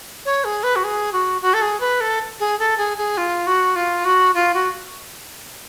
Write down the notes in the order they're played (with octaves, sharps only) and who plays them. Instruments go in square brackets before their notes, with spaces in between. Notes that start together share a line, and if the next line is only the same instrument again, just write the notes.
[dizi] C#5
G#4
B4
F#4
G#4
F#4
F#4
A4
G#4
B4
A4
G#4
A4
G#4
G#4
F4
F#4
F4
F#4
F4
F#4